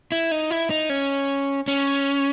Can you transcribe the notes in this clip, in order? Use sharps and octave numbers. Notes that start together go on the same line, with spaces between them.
E4
D#4
E4
D#4
C#4
C#4